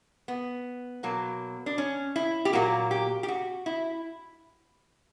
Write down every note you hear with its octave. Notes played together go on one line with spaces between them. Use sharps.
B3
B2 F#3 A#3
D4
C#4
E4
G4
A#2 F#3 A#3 F#4
G4
G4
F#4
E4